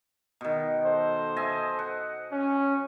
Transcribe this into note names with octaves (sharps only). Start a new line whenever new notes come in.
B2 D#3
A4 C5
D#5 E5 G#5
F#5
C#4